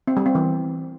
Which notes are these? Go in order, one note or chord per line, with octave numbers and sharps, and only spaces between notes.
C4
G3
C4
E3